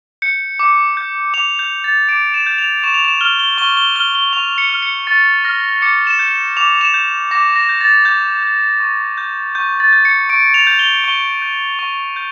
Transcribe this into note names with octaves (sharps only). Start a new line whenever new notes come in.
G6 C#7
D6
G6
D6 F7
G6
G6
A6
D6 D7
E7
G6
F7
C#6 E7
F7
E7
F6 G7
G7
C#6 G7
G7
F6 G7
G7
C#6 F7
C#7
F6
C#7
C#6 A6
F6 A#6
D6 C#7
E7
G6
D6 F7
E7
G6
D6 A#6
A#6
G6
A6
D6 G6
G6
C#6
G6
C#6 G6
A6
G6
C#7
C#6 D7
F7
G6
G7
C#6 G7
G6
C#6
G6